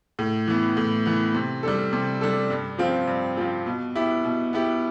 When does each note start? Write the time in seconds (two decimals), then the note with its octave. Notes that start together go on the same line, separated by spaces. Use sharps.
0.19 A2
0.48 E3 B3
0.77 A2
1.06 E3 B3
1.35 C3
1.63 G3 D4 A4
1.93 C3
2.21 G3 D4 A4
2.50 G2
2.78 F3 C4 F4
3.07 G2
3.37 F3 C4 F4
3.66 B2
3.95 B3 E4 G4
4.24 B2
4.53 B3 E4 G4